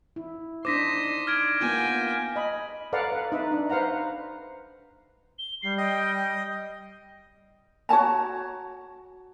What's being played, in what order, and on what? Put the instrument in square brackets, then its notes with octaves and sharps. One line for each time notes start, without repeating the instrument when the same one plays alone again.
[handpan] E4
[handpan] D4 D#4 C5 [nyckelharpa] C6 D#6 [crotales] D6 A#6 B6
[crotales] F6 G#6 D7
[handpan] A#3 B3 F4 [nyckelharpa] G5 G#5
[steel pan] D#5 B5
A4 B4 D5 F5 F#5 A#5
B4
D#4 B4 E5
D4
B4 C5 F5 F#5 A#5
[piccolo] G7
[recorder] G3 [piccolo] C7
[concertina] D#5 [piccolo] G5
[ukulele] F#4 C#5 A5 A#5